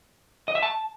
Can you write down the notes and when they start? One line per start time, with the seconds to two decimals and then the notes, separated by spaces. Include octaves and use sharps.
0.48 D#5
0.55 E5
0.62 A5